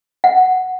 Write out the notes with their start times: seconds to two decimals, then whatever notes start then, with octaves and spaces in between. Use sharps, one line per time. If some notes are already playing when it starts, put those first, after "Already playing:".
0.24 F#5